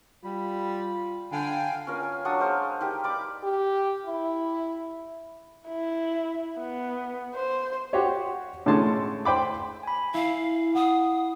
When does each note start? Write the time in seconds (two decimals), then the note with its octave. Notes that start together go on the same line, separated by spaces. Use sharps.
0.25 G3 F4 B5
1.32 D3 F5 G5 G#5
1.87 C#4 F4 A#4
2.03 G#5
2.25 F#3 D4 C#6 D#6
2.40 G#3 C5 F5
2.81 D#4 G4 A#4
3.04 D5 B5 D6
3.44 G4
4.06 E4
5.68 E4
6.60 B3
7.35 C5
7.93 F#4 G4 C5 C#5
8.66 A2 D3 G#3 C#4 A5 C6
9.25 C5 G5 B5 D6
9.83 G#5 B5
10.14 E4 F5
10.75 F#5 D#6